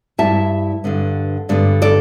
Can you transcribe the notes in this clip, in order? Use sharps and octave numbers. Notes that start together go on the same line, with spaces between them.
G2 G3 E4 E5 A5
G2 D3 B3
G2 D3 B3
A4 D5